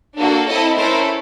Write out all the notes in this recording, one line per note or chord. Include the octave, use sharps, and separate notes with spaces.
A#3 D4 F#4 A4
C4 E4 A4 C#5 D#5
A3 C#4 E4 A4 A#4 C5